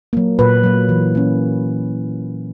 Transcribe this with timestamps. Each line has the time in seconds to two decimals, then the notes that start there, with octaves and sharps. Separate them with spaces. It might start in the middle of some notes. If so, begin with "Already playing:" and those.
0.13 F#3 A#3
0.39 A#2 B4
0.64 F#3 A#3
0.89 E3
1.15 A#3 C#4